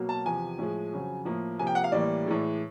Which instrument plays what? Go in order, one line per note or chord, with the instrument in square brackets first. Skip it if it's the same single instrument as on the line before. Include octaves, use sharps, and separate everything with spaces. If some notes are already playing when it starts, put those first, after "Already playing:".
Already playing: [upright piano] B2 F#3 A#3
A5
E2 C3 F3 G#5
A2 F3 G#3
F2 C#3 F#3
A2 F3 A#3
C3 F3 A#3 G#5
G5
F#5
F5
A2 E3 G3 A#3 D5
A2 E3 G#3